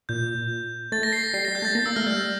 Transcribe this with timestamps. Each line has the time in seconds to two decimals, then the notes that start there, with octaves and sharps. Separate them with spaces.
0.09 A#2 G6
0.92 A3 A6
1.03 A#6
1.13 C7
1.24 A#6
1.34 G3 C7
1.45 G3 A#6
1.55 G6
1.62 A3
1.65 A6
1.75 A#3 A#6
1.86 A#3 E6
1.96 A3 F6
2.06 G3 G6